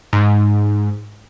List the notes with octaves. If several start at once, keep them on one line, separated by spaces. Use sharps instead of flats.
G#2